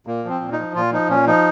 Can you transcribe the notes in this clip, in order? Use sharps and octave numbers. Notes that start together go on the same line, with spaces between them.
A#2 A#3
F3 C4
A#2
D#4
F3
A#2 F4
F3 D#4
A#2 C#4
F3 D#4